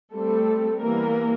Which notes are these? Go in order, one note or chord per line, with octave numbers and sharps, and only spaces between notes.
G3 A3 C4 A4
E3 G3 A#3 B3 A#4